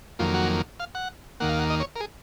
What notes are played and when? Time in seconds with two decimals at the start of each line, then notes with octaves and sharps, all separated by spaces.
0.19 F2 D#3 F#3 A#3 F4
0.34 F#4
0.80 F5
0.95 F#5
1.40 D#2 D#3 A#3 F#5
1.50 F5
1.59 F#5
1.70 D#5
1.80 C#5
1.96 A#4
2.00 G#4